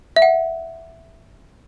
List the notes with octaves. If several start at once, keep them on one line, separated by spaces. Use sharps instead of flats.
E5
F#5